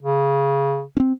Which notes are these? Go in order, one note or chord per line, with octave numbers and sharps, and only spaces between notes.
C#3
C4 C#4